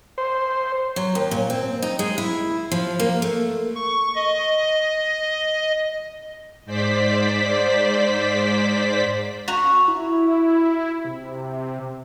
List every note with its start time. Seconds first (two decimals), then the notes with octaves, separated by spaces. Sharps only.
0.18 C5
0.96 F#3
1.15 D#2
1.31 A#2
1.50 C4
1.82 D#4
1.99 G#3
2.18 E4
2.72 F3
3.00 A#3
3.22 A3
3.75 C#6
4.15 D#5
6.66 G#2 C5 D5 B6
9.48 F#4 A#5
9.88 E4
11.05 C3